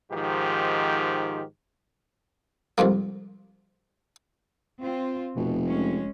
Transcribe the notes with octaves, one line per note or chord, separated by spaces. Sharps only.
G#2 D#3 F3 G4
C2 F2 G#2 A#3
C4 F4
F1 B2
G#3 C#4